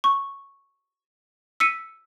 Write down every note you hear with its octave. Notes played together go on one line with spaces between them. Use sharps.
C#6
E6 B6 C#7 D#7